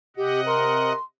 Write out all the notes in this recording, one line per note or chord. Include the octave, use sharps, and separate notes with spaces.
C3 G4 D#5 F#5
A#4 C6